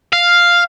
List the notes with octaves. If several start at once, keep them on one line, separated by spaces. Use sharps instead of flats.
F5